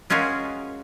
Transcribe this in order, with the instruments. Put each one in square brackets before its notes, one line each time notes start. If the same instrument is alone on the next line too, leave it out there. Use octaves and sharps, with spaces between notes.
[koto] G#3 C#4 F4 F#4 G#4 A#4